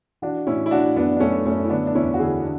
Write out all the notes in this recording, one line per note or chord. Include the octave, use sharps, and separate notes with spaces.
E3 D4 F#4
A2 C#4 E4
E4
A2 D4 F#4
F#2 B3 D4
D4
F#2 A3 C#4
F#2 A3 C#4
E4
D3 B3 D4
D4
E2 C#4 E4
F#4
D3 E4 G#4
D4